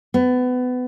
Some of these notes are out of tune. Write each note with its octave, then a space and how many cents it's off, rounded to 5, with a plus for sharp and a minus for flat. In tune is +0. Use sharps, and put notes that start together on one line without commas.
B3 +25